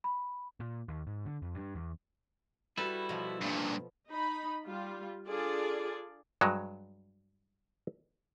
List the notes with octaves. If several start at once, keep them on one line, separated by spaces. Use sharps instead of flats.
B5
A#2
D#2
G#2
D3
F2
G2
E2
G3 E4 F#4 A4 B4
B2 F3
G2 A#2 D4
D#4 B5
G3 F4
D4 F4 G#4 A4 D5
G2 F#3 G#3